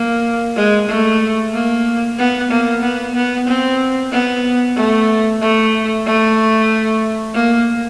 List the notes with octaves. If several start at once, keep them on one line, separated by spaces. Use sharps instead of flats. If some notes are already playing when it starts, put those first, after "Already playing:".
Already playing: A#3
G#3
A3
A#3
B3
A#3
B3
B3
C4
B3
A3
A3
A3
A#3